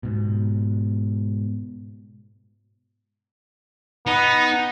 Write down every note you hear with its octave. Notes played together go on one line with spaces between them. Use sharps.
G#2 B2
B3 D#4